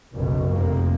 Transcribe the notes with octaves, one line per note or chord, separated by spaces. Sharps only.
F#1 B1 F#2 B2
F1 F2 C3 F3 A#3